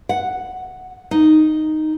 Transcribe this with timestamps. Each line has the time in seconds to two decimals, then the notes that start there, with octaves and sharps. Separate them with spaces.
0.09 F#5
1.11 D#4